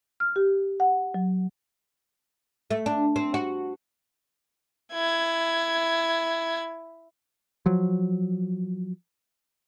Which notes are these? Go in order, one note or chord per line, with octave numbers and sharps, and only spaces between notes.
F6
G4
F#5
F#3
A3
D4
C4
F#4
E4 G#6
F3 F#3